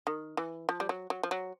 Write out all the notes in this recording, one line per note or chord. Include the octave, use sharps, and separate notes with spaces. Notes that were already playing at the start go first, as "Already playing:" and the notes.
D#3
E3
F3
G3
F#3
F#3
F3
F#3